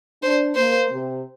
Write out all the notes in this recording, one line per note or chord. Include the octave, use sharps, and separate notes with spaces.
D4 C5
A#3 C5
C3